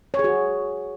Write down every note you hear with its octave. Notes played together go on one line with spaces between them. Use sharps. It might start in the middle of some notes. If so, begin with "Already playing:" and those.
C#5
G#4
F#4